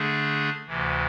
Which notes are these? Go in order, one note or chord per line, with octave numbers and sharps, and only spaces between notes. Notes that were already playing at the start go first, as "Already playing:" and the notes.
Already playing: D3 A3 D4 G#4
D2 C3 E3